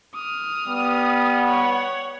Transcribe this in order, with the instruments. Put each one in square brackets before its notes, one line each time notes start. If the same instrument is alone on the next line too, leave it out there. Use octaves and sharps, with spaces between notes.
[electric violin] D#6 F6
[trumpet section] G3 B3
[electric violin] C#5 F#5